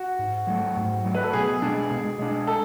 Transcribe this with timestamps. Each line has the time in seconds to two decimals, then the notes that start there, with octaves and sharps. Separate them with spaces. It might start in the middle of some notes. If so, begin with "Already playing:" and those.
Already playing: F#4
0.19 G#2
0.47 F#3 A3
0.76 G#2
1.05 F#3 A3
1.15 B4
1.23 A4
1.33 B2 G#4
1.62 G#3 D4
1.90 B2
2.19 G#3 D4
2.47 A4